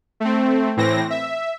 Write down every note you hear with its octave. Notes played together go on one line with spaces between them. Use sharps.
A3 C4
A2 E3 C4 A#6
E5